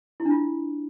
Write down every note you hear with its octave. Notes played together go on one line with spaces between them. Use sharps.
E4
D4
F4